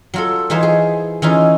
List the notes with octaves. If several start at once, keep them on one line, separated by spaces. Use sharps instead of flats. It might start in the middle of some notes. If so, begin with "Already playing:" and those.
F#3 F4 A4
E3 D#4 F4 C5 C#5
G#4
E3 C#4 D#4 F4